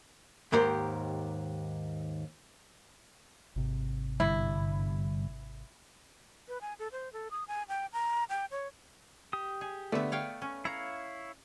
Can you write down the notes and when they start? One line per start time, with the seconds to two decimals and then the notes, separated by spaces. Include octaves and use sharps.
0.52 D#2 G#2 G4 A#4 C5
3.56 G#1 C3
4.20 G2 D3 G3 E4
6.48 B4
6.61 G#5
6.79 A4
6.92 C5
7.13 A4
7.31 D#6
7.48 G#5
7.69 G5
7.93 A#5
8.29 G5
8.51 C#5
9.33 G4 D#6
9.61 G#4
9.92 D3 A3 B3 E5
10.12 C#5 F5 G5
10.42 C#4
10.65 E4 C#5 F5 A#5